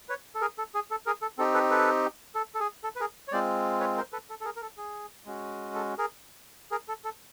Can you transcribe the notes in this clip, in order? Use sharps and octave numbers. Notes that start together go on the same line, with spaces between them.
B4 C#5
A4
G#4 A#4
A4
G#4
A4
G#4 A#4
A4
C4 D#4 G4 A4
A4 B4
A4 B4
A4
A4
G#4
A4
B4
G#4 A#4
C#5
G#3 C4 F4 C5 D5
B4 C#5
A#4 C5
A4 B4
A4
A4
G#4 A#4
A#4
A4
G#4
G#3 C#4 F#4
A4
G#4 A#4
G#4 A#4
A4
A4